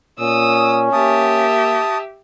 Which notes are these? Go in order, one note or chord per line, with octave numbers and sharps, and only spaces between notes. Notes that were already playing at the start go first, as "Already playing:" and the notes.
A#2 C#4 D#6 E6
A#3 G4 E5 A5 D#6